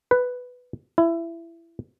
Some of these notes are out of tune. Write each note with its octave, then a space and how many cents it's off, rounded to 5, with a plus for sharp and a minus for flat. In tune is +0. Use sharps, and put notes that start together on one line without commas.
B4 +5
E4 +20